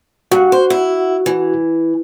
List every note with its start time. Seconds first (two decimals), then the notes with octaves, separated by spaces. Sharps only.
0.31 G2 F#4 F#5
0.52 C5
0.70 E4
1.26 E3